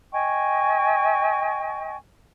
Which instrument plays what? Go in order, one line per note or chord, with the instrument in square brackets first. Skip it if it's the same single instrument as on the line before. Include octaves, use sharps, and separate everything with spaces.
[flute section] D#5 G5 G#5 C#6